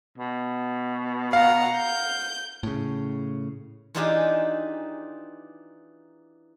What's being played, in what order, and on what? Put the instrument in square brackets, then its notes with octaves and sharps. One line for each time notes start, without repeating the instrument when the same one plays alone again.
[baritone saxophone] B2
[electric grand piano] F5 [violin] F#5 A#5
[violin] G6
[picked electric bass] A2 C#3
[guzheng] E3 D4 D#4 F4 G4 G#4